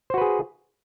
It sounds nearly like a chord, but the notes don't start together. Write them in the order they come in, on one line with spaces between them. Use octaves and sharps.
C5 F#4 B4 G#4